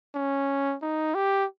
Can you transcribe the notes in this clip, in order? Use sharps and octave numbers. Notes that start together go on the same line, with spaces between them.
C#4
D#4
G4